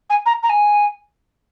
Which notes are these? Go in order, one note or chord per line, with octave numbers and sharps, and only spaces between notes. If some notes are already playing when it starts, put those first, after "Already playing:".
G#5
A#5
A#5
G#5